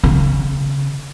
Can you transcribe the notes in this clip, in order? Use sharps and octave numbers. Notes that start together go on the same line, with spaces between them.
C#3